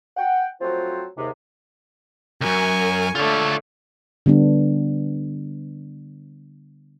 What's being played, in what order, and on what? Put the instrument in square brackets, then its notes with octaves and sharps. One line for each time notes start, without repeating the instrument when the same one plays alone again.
[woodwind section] F#5 G5
F3 F#3 A3 C4 F4 C5
D#2 G#2 C3
[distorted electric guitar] C#2 F#2 [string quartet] A#4 G#5 C#6
[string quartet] D3 A3 [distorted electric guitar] F4 C#5
[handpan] D3 G3 B3 D4